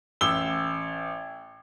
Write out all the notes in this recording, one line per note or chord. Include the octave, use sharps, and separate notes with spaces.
A1 E6 G7